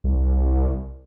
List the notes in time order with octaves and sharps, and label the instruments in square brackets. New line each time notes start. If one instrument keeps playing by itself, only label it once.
[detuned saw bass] C2